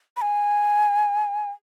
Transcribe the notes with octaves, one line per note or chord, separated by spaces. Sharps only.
B5
G#5